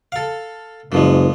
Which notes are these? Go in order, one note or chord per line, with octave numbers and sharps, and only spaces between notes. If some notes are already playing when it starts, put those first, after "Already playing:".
A4 F5
F#1 E3 F3 G#3